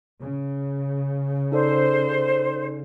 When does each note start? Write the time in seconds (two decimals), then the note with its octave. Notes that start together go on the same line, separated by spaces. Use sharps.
0.20 C#3
1.52 D#4 A4 C5 D5